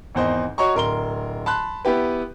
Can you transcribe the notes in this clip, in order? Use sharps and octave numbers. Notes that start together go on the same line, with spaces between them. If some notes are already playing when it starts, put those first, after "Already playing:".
G#1 E2 C5 D#5
F#4 C#5 D#5 A#5 C#6
D1 A#4 C6 G7
A5 B5 C6 F#6
B3 E4 G4 B4